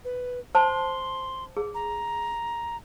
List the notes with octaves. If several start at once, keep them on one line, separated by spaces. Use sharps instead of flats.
B4
C5 A5 C6
G#4
A#5